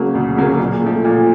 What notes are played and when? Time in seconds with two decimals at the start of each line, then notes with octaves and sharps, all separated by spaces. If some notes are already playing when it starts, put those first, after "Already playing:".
Already playing: C#3 F#3 A#3
0.15 D2
0.37 C#3 F#3 A#3
0.59 A#2
0.82 F3 A3
1.05 A#2